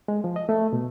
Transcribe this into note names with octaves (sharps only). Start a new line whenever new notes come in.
G#3
F3
D#5
A3
B2